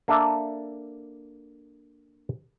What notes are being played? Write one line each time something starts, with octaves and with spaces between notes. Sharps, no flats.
A#3 D4 A4 E5